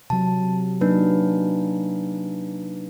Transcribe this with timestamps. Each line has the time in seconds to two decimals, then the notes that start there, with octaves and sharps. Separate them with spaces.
0.10 C3 F#3 A5
0.81 F#3 A#3 D4 D#4 B4